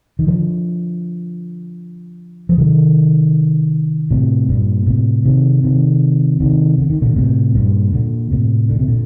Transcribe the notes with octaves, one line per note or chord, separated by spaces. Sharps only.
D#3
D3 F3
F3
C3 D#3
A2 C3
G2 A#2
A2 C3
C3 D#3
C3 D#3
C3 D#3
D3
D#3
A#2 D3
A2 C3
G2 A#2
A#2 D3
A2 C3
D3
C3
A#2 D3